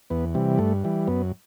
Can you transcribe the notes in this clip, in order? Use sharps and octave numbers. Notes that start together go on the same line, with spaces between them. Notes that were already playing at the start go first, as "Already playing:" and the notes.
E2 B3
C3 E3 G3
G2 A3
E3 G3
F#2 B3